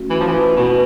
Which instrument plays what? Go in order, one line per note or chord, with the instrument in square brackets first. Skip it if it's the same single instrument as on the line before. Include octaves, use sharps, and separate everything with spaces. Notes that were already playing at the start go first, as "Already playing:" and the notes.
Already playing: [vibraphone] A3 C#4 F#4
[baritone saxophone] E3
F3
E3
B2